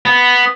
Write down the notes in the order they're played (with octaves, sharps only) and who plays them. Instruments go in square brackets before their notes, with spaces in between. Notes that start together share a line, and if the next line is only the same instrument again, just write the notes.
[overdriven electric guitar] B3